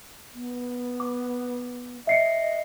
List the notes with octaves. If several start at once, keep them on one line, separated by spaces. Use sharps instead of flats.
B3
D6
D#5 E5 C7 C#7